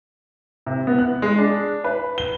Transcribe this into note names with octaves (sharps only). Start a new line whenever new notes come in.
C3
B3
F#6
G#3
D4
B4
G7